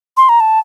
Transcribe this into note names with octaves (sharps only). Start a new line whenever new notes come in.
C6
A#5
A5